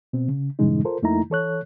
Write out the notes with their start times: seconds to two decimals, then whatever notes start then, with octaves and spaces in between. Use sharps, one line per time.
0.13 B2 C4
0.28 C#3
0.59 G2 A#2 C#3 E3 G#3 D#4
0.85 F4 A4 A#4 C5
1.02 F2 A3 A#3 D#4 E4 A#5
1.30 E3 A4 C#5 F#6